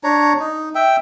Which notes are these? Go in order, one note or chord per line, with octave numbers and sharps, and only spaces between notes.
D4 C#5 A#5
D#4
E5 G5